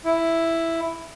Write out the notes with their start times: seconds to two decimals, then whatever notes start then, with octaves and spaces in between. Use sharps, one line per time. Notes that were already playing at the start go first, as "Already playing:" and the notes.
0.05 E4